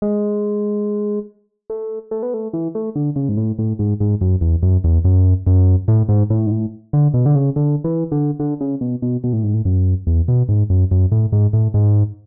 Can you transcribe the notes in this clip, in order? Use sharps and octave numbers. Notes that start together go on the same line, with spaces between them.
G#3
A3
A3
B3
A3
E3
A3
D3
C#3
G#2
A2
A2
G#2
G#2
F#2
E2
F#2
E2
F#2
F#2
A2
G#2
A2
G#2
A2
D3
B2
D3
C#3
D3
E3
D3
D3
C#3
B2
B2
B2
A2
G#2
A2
F#2
E2
B2
G#2
F#2
F#2
A2
G#2
A2
G#2